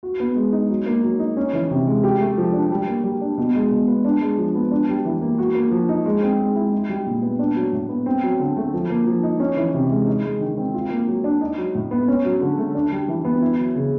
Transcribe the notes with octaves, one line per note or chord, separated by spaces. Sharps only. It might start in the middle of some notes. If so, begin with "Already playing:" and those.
F#4
B3
G#3
D#4
F#3
A#3
F#3
D#4
C#4
E3
C3
G#3
G4
A3
F3
D4
G3
A#3
G3
D4
B2
G#3
B2
B3
D4
G#3
F3
B3
D4
G3
E3
A#3
F#4
A#3
F3
D#4
G#3
C4
G#3
E4
D#4
G3
A#2
B3
D4
F#3
A2
B3
C4
F#3
D3
A3
F3
A#3
F3
D#4
C#4
E3
C3
G#3
D#4
G#3
D#3
C4
F4
A#3
F#3
D4
D#4
F#3
A2
B3
C#4
F#3
D3
A3
D4
G3
E3
B3
E4
F#3
C#3